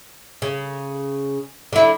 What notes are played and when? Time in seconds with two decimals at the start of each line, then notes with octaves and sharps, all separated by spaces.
0.42 C#3
1.73 D3 E4